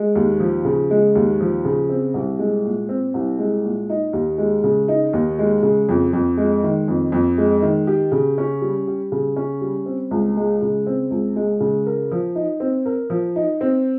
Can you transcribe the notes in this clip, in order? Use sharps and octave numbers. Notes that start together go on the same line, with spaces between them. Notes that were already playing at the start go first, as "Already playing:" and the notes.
Already playing: G#3
D#2
F3
C#3
G#3
D#2
F3
C#3
C4
C2
G#3
A#2
C4
C2
G#3
A#2
D#4
D#2
G#3
C#3
D#4
D#2
G#3
C#3
F2
F2
G#3
D#3
F2
F2
G#3
D#3
G4
C#3
C#4
G3
G4
C#3
C#4
G3
C4
C#2
G#3
C#3
C4
C#2
G#3
C#3
A#4
F3
D#4
C4
A#4
F3
D#4
C4